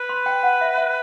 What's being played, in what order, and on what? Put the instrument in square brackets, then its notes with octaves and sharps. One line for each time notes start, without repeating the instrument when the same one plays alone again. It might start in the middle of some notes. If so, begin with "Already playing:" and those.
Already playing: [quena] B4
[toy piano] C6
G5
F#5
E5
E5